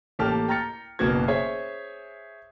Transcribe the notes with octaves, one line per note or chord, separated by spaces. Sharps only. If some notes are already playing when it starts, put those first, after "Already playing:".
A1 A#3 G4 A4 A5 F6
G5 A#5 F6 A6 C#7
F#1 B2 A#3 B3 F#4 G#6
G#4 C5 C#5 E5